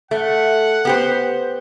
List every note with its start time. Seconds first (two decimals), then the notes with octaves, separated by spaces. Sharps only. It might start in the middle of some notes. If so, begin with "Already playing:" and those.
0.11 A3 F#5
0.85 B3 G4 C5